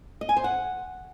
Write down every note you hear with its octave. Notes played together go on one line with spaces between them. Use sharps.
D#5
G#5
C5
F#5